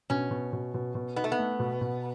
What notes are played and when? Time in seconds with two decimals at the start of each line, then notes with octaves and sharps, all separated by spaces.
0.10 B2 C#4
0.31 B2
0.53 B2
0.74 B2
0.95 B2
1.16 B3 D#4
1.24 A3
1.32 B3
1.39 A3
1.59 B2
1.81 B2